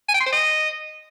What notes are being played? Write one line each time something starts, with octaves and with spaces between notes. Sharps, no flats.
G#5
G5
C6
C5
D#5